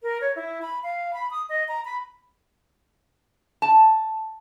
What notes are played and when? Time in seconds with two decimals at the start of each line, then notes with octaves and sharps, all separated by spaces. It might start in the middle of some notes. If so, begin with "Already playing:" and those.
0.03 A#4
0.21 C#5
0.36 E4
0.62 B5
0.83 F5
1.14 B5
1.31 D#6
1.49 D#5
1.68 A#5
1.85 B5
3.62 A5